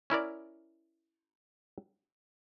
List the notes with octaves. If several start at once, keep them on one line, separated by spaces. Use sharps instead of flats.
C#4 E4 A#4 D5